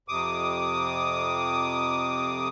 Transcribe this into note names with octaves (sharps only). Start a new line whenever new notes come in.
F2 C3 D6 D#6